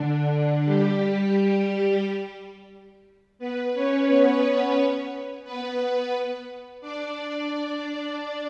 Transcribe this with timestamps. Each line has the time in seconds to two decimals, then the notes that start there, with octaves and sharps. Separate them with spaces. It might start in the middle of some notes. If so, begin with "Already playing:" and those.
Already playing: D3 D4
0.65 G3 G4
3.39 B3 B4
3.73 C#4 C#5
4.08 B3 B4
5.44 B3 B4
6.81 D4 D5